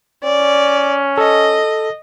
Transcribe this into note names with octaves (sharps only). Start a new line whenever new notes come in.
C#4 D5
A4 D#5